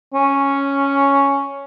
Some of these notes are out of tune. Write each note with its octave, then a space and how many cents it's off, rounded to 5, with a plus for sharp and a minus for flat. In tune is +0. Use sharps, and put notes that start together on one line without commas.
C#4 +0